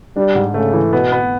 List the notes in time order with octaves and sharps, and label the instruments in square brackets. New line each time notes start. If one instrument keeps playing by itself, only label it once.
[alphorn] G3 [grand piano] D4
[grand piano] G#2
[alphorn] C#3 [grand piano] A3
[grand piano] E3
[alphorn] B2 [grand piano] B3
[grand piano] B3